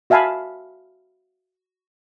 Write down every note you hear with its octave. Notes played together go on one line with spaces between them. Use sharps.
F#4 E5 F5 G#5 A5 B5